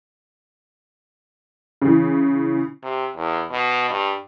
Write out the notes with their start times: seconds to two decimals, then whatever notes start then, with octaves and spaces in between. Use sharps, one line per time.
1.82 C#3 E3
2.83 C3
3.16 E2
3.51 B2
3.90 G2